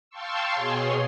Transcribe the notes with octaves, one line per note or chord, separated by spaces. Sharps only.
F5 G5 A5 C6 C#6 E6
B2 G#4 C#5 C6